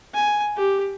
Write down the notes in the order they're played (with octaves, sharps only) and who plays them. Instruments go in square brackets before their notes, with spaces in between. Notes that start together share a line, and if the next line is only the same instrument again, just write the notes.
[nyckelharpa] G#5
G4